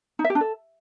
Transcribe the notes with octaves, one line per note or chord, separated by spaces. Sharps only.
D#4
E5
G4
D4
A4